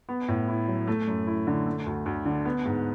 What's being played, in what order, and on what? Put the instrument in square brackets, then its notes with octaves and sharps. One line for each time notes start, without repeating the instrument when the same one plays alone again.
[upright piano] B3
A2
E4
F#3
A3
F#2
E4
D3
A3
D2
D2
D3
B3
G#2